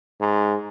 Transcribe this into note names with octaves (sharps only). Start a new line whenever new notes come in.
G#2